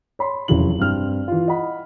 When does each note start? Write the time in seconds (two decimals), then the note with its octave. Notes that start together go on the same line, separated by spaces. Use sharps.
0.19 C#5 B5 C6
0.48 F1 C#3 E3 F#3 E4 F#7
0.79 G2 C4 F6
1.28 E3 F4
1.48 D#5 F#5 B5